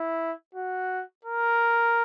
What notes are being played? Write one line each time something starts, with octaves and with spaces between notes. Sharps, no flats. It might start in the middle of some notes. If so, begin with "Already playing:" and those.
Already playing: E4
F#4
A#4